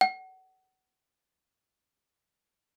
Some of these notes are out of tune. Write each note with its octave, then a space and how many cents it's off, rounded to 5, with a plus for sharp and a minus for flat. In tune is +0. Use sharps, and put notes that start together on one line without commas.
F#5 +25